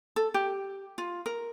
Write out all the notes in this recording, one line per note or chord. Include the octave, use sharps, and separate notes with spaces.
A4
G4
F4
A#4